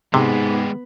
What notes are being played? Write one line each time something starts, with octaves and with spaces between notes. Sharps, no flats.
G#2 C3 G#3 B3 G4